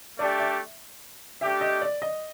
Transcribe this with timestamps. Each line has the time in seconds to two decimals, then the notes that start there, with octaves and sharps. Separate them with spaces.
0.18 A3 D4 G4 D5
0.39 E5
1.41 A3 D4 G4 E5
1.61 D#5
1.82 D5
2.02 D#5